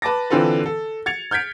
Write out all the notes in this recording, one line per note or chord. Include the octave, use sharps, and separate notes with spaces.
B4 A5 D6 A6 A#6
D3 E3 C4 F4 A4 B4
A4
G#6 A6 C#7 F7
F6 G6 G#6 B6 D7